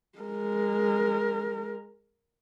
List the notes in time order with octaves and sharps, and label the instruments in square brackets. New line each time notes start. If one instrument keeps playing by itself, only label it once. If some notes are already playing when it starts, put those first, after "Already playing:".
[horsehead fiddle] G#3 A#4